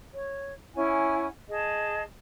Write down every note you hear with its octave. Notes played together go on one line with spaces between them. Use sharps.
C#5
C#4 E4 F#5 G#5
G#4 D#5 A5